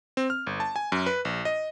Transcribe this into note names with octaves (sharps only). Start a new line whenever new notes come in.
C4
F6
G1
A5
G#5
F#2
B4
A#1
D#5